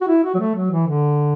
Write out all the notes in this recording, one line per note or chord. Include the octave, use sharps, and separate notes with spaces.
F#4
E4
F#4
F#3
A3
F#3
E3
D3